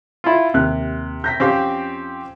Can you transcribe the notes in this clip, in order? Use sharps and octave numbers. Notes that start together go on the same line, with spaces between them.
E4 F4
D#2 C3 F#6
G6 A#6 B6
F2 C4 C#4 G4 F5 C7